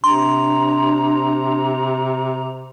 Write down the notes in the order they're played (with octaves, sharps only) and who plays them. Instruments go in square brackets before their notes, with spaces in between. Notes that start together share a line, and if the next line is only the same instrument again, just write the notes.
[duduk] C3 [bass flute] D4 [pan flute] A#5 [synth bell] C6